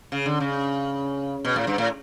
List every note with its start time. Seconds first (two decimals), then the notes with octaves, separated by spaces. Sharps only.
0.12 C#3
0.26 D3
0.40 C#3
1.45 B2
1.56 A2
1.67 G2
1.78 A2